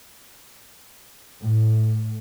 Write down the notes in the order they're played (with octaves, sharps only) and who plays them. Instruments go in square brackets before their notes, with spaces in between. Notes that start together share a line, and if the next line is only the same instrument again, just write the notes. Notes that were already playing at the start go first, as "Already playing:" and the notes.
[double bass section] A2